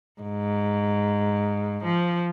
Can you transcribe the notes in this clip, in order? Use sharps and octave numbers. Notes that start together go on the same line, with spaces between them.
G#2
F3